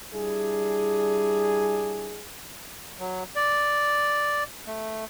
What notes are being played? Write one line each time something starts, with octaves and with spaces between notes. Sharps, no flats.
G3 D4 E4 G#4
F#3
D5
A3